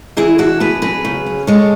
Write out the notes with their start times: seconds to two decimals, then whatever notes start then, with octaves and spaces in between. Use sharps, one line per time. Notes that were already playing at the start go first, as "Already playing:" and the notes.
0.17 E3 E4 G#4
0.38 D4 F#4 A4
0.60 B3 G#4 B4
0.82 F#3 G#4 B4
1.05 C#3
1.26 C#4
1.47 G#3 A4 C#5